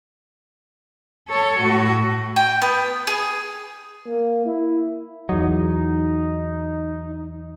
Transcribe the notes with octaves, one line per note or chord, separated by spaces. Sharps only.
A4 C#5
A2 F#4
G5
B3
G#4
A#3
E4
E2 F#3 D#4